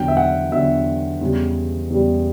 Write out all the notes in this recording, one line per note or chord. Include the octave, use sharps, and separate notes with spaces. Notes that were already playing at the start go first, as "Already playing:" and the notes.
Already playing: E2 D3 F#3 G5
E5
F#5
E2 D3 F#3 E5
E2 C#3 G3
E2 C#3 G3